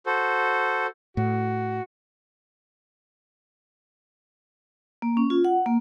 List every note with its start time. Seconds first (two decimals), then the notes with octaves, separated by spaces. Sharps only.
0.06 F#4 A4 C5
1.17 A2 F#4
5.02 A#3
5.17 C#4
5.30 F4
5.45 F#5
5.66 A#3